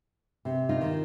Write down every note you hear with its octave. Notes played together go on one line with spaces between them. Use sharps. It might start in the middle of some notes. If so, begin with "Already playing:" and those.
C3
D#4 F4
D#3